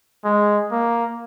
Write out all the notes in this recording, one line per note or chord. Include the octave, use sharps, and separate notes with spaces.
G#3
A#3